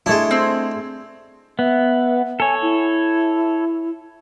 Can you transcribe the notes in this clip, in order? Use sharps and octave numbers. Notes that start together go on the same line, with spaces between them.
G#3 A3 D4 E4
C4
B3 E5
A4 C#5 G#5
E4